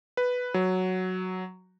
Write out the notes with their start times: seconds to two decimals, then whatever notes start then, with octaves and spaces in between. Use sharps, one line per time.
0.17 B4
0.54 F#3